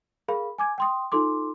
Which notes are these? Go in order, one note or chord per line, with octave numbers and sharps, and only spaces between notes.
G#4 A#4 F5 B5
G#5 D6 G#6
G5 C6 D#6
D#4 F4 A4 C6 D6